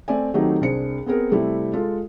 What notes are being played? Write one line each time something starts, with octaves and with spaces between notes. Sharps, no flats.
A3 C4 D5 G#5
D#3 F#3 A3 C4 D#4 G4
C2 D4 G#4 C5 C#7
B3 C4 G#4 A#4
C3 G3 A3 C4 E4
G#3 F4 A4